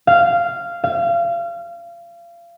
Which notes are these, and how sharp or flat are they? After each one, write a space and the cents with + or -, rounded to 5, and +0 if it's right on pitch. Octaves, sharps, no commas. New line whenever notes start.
F5 -10
F5 -30